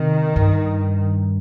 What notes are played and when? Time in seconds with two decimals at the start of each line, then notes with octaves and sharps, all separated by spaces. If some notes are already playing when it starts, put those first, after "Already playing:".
Already playing: C3 D#3
0.36 G2